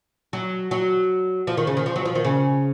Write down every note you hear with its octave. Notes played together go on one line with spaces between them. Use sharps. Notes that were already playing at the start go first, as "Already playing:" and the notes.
F#3
F#3
F3
D#3
C#3
D#3
F3
F#3
F3
D#3
C#3